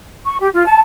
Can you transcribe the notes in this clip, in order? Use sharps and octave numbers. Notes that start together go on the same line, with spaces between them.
C#6
G4
F4
A5